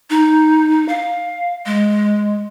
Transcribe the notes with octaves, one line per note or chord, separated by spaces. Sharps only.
D#4
F5
G#3